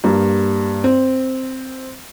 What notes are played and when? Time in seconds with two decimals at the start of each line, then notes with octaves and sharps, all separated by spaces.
0.04 G2 A#3
0.84 C4